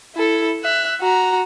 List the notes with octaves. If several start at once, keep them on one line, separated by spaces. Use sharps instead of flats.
E4 A4
E5 F#6
F#4 A#5